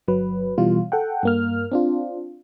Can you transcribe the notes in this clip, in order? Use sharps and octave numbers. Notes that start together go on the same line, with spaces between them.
G1 F#3 B4
B2 E3 G3 F4
A4 F#5 G5
G2 A#3 F6
C4 D4 F4